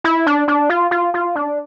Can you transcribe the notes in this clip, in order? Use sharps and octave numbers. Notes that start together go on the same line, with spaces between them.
E4
D4
D4
F4
F4
F4
D4